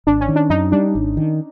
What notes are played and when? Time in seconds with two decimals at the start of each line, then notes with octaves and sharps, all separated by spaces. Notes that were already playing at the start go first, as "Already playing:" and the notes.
0.07 G#1 D4
0.21 C#4
0.28 D#3
0.36 D4
0.50 F#2 D#4
0.72 G3 D4
0.95 G#1
1.17 D#3